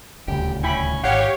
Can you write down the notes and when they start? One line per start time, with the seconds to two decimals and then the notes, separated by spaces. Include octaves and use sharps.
0.28 D#1 D2 C#3 G4
0.63 C#4 E4 G5 B5
1.04 G#1 G4 C#5 F5 F#5